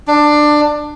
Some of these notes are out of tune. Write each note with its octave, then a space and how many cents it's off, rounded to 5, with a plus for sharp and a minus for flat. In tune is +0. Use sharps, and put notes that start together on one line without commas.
D4 +15